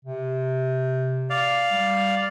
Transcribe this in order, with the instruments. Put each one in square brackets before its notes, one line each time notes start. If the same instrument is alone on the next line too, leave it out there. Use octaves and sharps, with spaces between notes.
[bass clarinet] C3
[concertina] D5 F5
[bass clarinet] G3